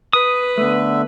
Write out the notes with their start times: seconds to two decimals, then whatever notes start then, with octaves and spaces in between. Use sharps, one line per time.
0.13 B4 D#6
0.58 D3 A3 B3 E5